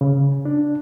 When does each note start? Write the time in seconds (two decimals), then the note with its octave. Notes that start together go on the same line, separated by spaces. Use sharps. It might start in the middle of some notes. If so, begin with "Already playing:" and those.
0.01 C#3
0.45 D4